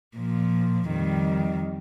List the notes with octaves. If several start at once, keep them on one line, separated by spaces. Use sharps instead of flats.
A#2 F3
F2 D#3 G3